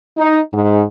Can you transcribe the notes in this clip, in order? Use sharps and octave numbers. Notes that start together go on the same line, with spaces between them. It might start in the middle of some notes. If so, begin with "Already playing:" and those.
D#4
G#2